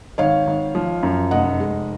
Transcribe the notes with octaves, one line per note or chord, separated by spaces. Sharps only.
G#1 C#5 F5
G#1
F3
F#2
F1 D#5 F#5
G#3